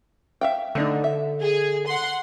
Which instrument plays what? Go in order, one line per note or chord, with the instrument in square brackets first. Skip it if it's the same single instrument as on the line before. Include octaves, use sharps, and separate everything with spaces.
[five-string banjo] E5 F5 G5
[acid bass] D3 [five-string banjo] A3 D4 D#4
[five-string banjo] E5
[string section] G#4
F#5 C6